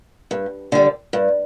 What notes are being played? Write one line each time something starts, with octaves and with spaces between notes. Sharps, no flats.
G2
D3 G3
G2